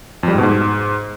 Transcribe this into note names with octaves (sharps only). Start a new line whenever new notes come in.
F2
G3
G#2
B2
G#2